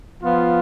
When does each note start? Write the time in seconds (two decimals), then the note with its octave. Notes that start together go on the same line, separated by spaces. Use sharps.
0.22 F3 B3 F4